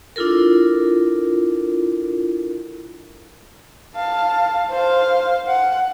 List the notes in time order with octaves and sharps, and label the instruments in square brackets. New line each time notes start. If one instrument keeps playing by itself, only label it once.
[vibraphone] D4 E4 F4 A4 A#4
[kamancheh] F5 A5
C5 F5
F#5